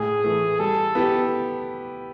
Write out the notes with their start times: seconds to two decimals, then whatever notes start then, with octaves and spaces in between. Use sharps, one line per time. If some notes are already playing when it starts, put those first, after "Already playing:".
Already playing: A2 G#4
0.24 E3 A3
0.60 G3 A4
0.95 B3 E4 G4